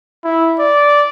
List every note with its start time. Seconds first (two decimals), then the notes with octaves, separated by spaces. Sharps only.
0.24 E4
0.60 D5